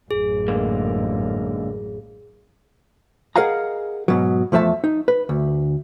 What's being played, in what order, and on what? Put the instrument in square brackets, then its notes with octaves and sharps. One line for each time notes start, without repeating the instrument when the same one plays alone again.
[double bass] A1 F#2 [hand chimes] G#4
[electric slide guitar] G#2 D3 A#3
[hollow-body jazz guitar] G#4 A#4 D#5 F5 F#5 A#5
G#2 B2 F#3
E2 F3 A3 E5 A5
D#4
B4
D2